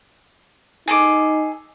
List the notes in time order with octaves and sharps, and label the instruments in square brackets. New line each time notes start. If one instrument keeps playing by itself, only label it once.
[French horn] D#4 [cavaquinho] G#4 A4 D6